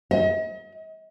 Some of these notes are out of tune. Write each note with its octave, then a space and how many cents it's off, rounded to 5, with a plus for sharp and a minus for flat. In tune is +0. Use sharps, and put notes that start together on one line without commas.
D#5 +40